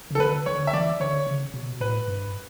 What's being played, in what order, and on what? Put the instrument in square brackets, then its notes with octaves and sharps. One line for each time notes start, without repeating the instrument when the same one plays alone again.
[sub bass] C#3
[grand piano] A4
[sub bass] D3 [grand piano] B4
[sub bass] D3 [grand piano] C#5
[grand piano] E5
[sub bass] E3 [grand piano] D5
[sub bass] D3 [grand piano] C#5
[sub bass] C#3
B2
[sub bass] A2 [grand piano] B4
[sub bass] G2